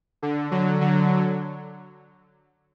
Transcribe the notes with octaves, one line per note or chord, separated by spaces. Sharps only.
D3
D3 F#3
D3 F#3